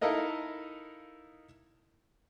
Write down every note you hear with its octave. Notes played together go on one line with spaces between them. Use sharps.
D#4 E4 A4 A#4 D#5 F5